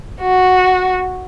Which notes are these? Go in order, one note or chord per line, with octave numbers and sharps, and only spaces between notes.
F#4